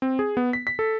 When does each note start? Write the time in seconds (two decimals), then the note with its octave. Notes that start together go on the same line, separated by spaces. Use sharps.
0.02 C4
0.19 G#4
0.37 B3
0.53 B6
0.67 B6
0.79 A4